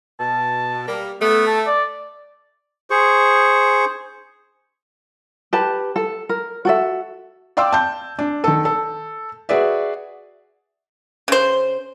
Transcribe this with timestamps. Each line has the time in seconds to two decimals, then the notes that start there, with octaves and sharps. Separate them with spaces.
0.20 B2 A5
0.86 G3 A#3
1.21 A3 B3
1.47 A5
1.66 D5
2.90 G#4 C5 C#6
5.53 G4 B4 A5
5.96 A4
6.29 A#4
6.65 F#4 A4 E5
7.57 D5 F5 G5 C6 D6 E6
7.72 A5 G6
8.19 D4
8.44 D#3 A4
8.65 A4
9.49 F#4 G#4 B4 D5 E5
11.28 C#3 C5